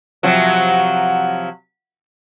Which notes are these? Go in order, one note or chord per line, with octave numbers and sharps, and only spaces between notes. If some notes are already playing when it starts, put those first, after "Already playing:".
C3 F3 F#3